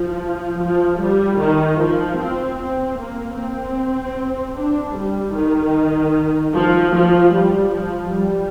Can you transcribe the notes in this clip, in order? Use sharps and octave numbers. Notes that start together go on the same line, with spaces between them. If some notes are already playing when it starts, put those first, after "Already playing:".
Already playing: F3
F3
G3
D#3
F3
C4
C4
A#3
C4
D4
G3
D#3
F3
F3
G3
F3
G3